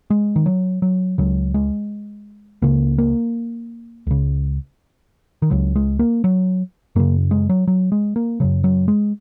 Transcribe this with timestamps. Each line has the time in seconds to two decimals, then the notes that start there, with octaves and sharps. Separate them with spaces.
0.10 G#3
0.36 D#3
0.46 F#3
0.82 F#3
1.18 C#2 C#3 F#3
1.54 G#3
2.62 C#2 C#3 A#3
2.98 A#3
4.07 C#2 C#3
5.42 D#3
5.51 C#2 C#3 F#3
5.75 G#3
5.99 A#3
6.24 F#3
6.96 F#2 C#3 A#3
7.31 G#3
7.49 F#3
7.68 F#3
7.92 G#3
8.16 A#3
8.40 F#2 C#3 F#3
8.64 F#3
8.88 G#3